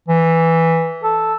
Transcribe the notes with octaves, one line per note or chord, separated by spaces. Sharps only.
E3
A4